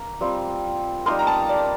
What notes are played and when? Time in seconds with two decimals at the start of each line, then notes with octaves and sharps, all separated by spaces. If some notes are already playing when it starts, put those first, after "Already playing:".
Already playing: A#3 A#5
0.21 G3 C4 F4
1.06 G3 A#3 D#4 A#4 C6
1.19 A#5
1.27 A5
1.49 D5